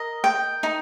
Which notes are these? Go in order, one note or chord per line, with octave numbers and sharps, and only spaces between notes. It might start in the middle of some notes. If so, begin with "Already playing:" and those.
Already playing: A#4 D#5
G5
D#4